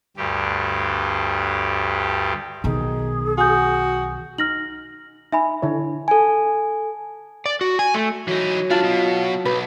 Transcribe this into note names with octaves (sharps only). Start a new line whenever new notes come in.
D2 G2 G4
B1 D#3 D#4 G#4
F#4 G#5 D#6 G6
D#4 F6 A#6 F#7
D#4 E5 G#5 B5
D3 E4 C#5
A4 G#5
D5
F#4
G#5
A3
E3 F#3 D#4
D2 D4 F4 A5
B2
B1 B4